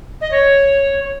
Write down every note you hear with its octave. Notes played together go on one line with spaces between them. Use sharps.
D#5
C#5